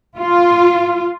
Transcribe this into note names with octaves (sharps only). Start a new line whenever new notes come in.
F4